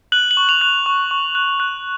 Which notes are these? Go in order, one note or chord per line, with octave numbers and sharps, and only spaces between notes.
F#6 F#7
F#7
C#6
F7
F#6
C#6
C#6
F#6
F#6